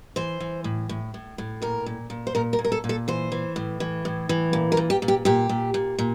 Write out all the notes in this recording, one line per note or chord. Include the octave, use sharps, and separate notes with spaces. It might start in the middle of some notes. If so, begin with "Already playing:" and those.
E3 C5
E3
A2
A2
A2
A2
A#2 A#4
A#2
A#2
C5
A#2 A#4
A#4
A#2
A#4
A4
A#2
A4
E3 C5
E3
A2
E3
A2
E3
A#2
A#4
A#2
G4
A#2
G4
A#2 G4
A#2
A#2
A#2